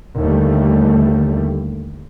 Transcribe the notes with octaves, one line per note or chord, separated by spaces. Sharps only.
D#2 D3 G3 A3